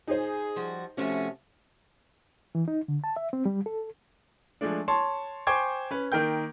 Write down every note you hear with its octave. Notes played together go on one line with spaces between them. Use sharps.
D#4 G#4 C5
F3 G3 F#4
C3 F3 A3 C#4 F#4
E3
D#4
D3
A5
E5
C4
G3
A4
F3 G#3 A3 D4
C#5 A5 C6
C5 G5 G#5 C#6 D6 G#6
C#4 B4
D#3 A#3 G5 G6